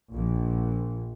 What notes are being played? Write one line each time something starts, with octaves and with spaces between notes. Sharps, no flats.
A#1